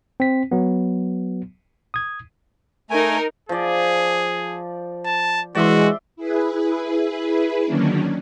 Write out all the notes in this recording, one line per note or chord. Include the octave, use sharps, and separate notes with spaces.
C4 B6
F#3 B3
D#6 G#6
A3 D#4 A#4 G#5
F3 G#4 D5
A5
E3 G#3 F#4 D5 E5 C6
E4 G#4 B4
D3 D#3 F#3 A#3 C#4 D4